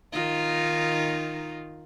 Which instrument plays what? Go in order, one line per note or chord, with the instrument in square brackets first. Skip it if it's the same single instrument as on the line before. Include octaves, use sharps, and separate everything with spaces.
[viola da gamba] D#3 D#4 F4